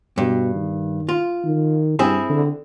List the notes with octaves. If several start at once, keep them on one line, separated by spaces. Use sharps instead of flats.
G2 B2
D#3
F4
D#3
G2 C4 E4 G#4
D3